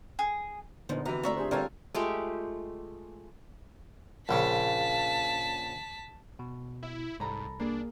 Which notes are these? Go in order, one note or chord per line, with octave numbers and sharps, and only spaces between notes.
G#4
A#2 D3 F3 B3 D#4
C3 E3 F#4 A#5
A3 C4 F4 D5 E5 A#5 C#6 E6
D4 G4 G#4 C5
E2 D3 G3 C4 F4 A4 A#4 C#5
G#3 A3 F4 G4
A#1 C#3 A5 B6
B2
E4 E5
C2 G#2 A4 A#5 B5
A#3 D4 G#4